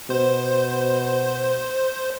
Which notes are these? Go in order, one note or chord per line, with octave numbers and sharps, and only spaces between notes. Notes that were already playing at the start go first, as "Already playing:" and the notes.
B2 C5